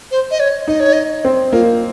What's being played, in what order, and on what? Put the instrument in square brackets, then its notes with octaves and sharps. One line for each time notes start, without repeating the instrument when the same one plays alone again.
[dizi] C5
D#5
C#5
[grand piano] D#4 [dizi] D#5
[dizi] C#5
D#5
[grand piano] C4
[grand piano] A#3 [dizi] F4